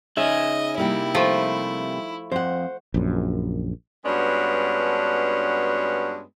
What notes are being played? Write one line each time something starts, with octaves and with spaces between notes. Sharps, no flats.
C#3 C#4 D#4 G#4 D#5 E5
C3 G3 A#3 E4
F3 A3
F2 C5 F#5
A#1 F#2
G2 G#3 B3 C#4 D4 F#4